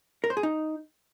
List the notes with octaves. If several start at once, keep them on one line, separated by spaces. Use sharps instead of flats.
A#4
C5
G#4
D#4